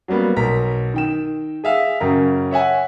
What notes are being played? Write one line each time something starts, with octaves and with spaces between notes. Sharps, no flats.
F#3 G3 A#3 B3
B1 A#4 A#5 B6
D#3 G5 E7
G#4 E5 F5
F#2 C#3 A#4 G5 A#5
C#5 E5 F#5 G#5